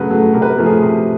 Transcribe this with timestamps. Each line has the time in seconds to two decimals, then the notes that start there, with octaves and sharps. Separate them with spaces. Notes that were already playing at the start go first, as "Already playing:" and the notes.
Already playing: C#3 F#3 A3 B4
0.10 F#3 A3
0.34 C3 A#4
0.42 B4
0.49 A#4
0.58 F3 A3
0.66 G#4
0.82 C3